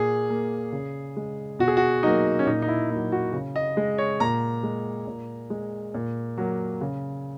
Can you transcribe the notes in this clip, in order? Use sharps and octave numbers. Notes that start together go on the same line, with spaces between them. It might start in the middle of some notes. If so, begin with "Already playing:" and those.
Already playing: A#2 G#4
A#3
C#3
G#3
B2 F#4
G#4
F#4
F#3 A#3 D#4
C#4
A#2 D#4
D#4
E4
F#3 A#3 E4
F#4
C#3
D#5
G#3
C#5
A#2 A#5
G#3
A#2
G#3
A#2
F#3 A#3
C#3